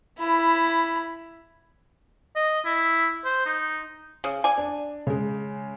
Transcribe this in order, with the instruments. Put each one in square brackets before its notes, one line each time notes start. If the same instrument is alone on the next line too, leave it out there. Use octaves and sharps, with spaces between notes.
[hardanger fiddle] E4 B5
[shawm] D#5
E4
C5
D#4
[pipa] C#3
D5 G#5
[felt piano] D4
C#3 G#3